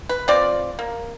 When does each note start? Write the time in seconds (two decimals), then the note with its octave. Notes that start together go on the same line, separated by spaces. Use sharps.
0.09 B4
0.28 C4 F4 D5
0.79 A#3